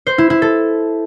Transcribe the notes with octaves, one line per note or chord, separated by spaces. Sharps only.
C5
E4
E4
A4